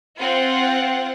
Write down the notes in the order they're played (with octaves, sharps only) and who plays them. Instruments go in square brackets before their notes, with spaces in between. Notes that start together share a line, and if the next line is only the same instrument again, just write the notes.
[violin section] C4 F4 F#5